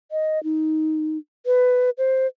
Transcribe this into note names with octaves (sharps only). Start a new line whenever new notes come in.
D#5
D#4
B4
C5